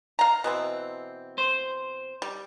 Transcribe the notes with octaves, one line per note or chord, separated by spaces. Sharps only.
F5 A#5
B2 E3 C4
C5
G3